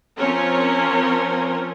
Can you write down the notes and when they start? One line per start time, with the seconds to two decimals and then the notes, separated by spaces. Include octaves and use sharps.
0.19 F3 C4 C#4 A#4 C#5